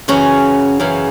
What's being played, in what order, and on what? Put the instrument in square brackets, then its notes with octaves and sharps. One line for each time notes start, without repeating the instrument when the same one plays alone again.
[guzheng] F#2 C#3 E3 C#4 F#4
F#2 C#3 E3